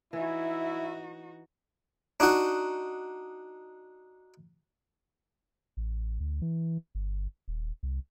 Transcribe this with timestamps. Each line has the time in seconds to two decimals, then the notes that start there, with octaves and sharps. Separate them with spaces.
0.13 E3 D#4 E4 F#4 C#5 E5
2.20 D4 D#4 F#4 F#5
5.77 A1
6.20 D2
6.42 E3
6.95 G1
7.48 D#1
7.83 C2